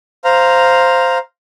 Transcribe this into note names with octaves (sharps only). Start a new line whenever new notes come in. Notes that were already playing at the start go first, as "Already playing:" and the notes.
C5 F5 A#5